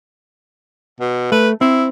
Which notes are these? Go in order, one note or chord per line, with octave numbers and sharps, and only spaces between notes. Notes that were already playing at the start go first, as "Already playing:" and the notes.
B2
A3 B4
C4 E4